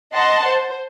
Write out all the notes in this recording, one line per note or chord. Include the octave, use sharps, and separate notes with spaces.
D#5 F#5 A5 C6
C5